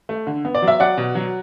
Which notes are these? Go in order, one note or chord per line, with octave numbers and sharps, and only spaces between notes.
A3
D3
B3
D5
F#3
E5
F#3 D5 F#5
B2
F#3